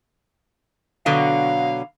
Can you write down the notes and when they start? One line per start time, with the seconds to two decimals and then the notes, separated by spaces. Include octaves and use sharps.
1.06 B2 D3 F#3 F5